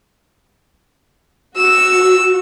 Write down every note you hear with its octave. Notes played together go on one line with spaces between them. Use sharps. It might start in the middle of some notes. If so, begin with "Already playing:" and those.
F#4 E6